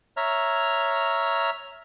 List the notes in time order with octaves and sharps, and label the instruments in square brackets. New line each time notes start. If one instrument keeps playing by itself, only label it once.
[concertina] C#5 E5 A#5 F6